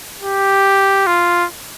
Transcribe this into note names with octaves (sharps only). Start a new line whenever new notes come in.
G4
F4